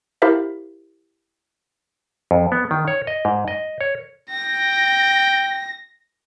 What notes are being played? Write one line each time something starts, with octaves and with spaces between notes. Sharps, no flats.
E4 G4 A#4 C5 E5 F5
F2
B3
D#3
C#5
D#5
G#2
D#5
C#5
G5 A#6